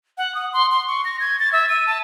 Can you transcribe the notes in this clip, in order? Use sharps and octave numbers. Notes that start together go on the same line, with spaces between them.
F#5
D#6
C6
C6
C#6
A#6
G#6
A6
E5
D#7
A5